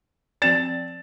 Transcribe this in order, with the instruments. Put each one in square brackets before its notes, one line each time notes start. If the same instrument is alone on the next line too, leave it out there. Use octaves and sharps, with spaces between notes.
[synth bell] F3 C4 D5 [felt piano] A6 E7